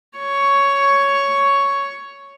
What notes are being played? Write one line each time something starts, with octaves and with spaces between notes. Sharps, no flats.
C#5 C#6